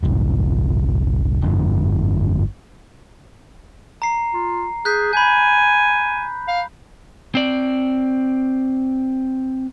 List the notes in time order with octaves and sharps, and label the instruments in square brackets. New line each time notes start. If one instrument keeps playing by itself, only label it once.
[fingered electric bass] G1 C2 F2 G#2
G1 F2 G#2 D3
[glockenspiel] A#5 C7
[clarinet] F4
[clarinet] G#4 [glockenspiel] F#6 G6 B6
[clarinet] G#5 [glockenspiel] B5 G6
[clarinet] F5
[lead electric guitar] C4 D5